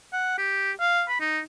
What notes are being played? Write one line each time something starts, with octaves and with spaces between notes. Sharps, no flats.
F#5
G4
F5
B5
D#4